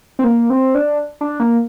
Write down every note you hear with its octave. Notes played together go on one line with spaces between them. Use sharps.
C4
A#3
C4
D4
D4
A#3